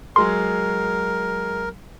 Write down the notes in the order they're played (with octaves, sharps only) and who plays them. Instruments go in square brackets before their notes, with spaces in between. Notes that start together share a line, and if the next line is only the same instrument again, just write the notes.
[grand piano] F#3 G#3 G#4 [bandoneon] A#4 [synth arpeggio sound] C6